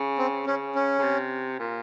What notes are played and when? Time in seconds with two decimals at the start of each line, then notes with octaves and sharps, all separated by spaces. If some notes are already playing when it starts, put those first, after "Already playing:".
Already playing: C#3
0.18 C4
0.46 C#3 C#4
0.75 C#4
0.99 C#3
1.03 C3
1.59 A#2